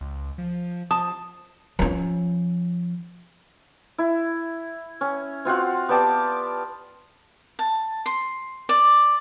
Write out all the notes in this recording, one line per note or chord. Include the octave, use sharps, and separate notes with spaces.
C#2
F3
F3 A5 D#6
F3 C#4
E4
C#4
C4 F4 F#4 F#5
B3 G4 D5 A5
A5
C6
D5